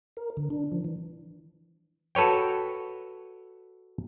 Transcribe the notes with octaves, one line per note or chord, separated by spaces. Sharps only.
A#4
D3
D4
F3
E3
F#4 A4 B4 C#5 G5